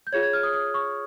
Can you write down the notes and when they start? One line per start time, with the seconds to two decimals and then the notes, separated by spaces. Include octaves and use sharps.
0.07 G6
0.12 F4 G#4 C#5 G#6
0.23 G#6
0.33 F6
0.43 D#6
0.54 D#6
0.74 C#6